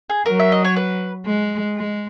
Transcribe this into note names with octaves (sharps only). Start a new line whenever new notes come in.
G#4
F#3 A#4
E5
D#5
C#5
B4
G#3
G#3